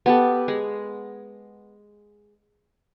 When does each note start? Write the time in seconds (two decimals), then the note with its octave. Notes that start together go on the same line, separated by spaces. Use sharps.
0.06 B3 G4 A4
0.48 G#3